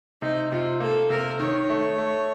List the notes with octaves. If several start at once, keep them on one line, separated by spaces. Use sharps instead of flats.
C3 D#4
C3 F4
A#3 A4
C3 A#4
D#3 C#5
A3
A3